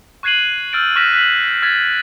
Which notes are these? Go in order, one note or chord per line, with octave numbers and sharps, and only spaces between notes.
C#6 F#6 G#6 C7 D#7 F#7
E6 F6 G6 A6 D7
C#6 F6 F#6 A#6 B6 E7
F#6 B6 F#7
F6 G#6 A6 B6